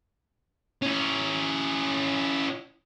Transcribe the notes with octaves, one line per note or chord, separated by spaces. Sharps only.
C#4 E4